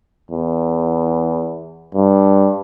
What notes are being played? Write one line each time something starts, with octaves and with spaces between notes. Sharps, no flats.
E2
G2